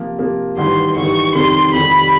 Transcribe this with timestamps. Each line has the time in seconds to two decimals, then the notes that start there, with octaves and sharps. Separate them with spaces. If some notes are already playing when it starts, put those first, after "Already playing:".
Already playing: C3 F3 A#3
0.19 C3 F3 A#3
0.57 A1 G2 D#3 C6
0.96 A1 G2 D#3 C#6
1.34 F2 C3 D#3 G3 C6
1.73 F2 C3 D#3 G3 B5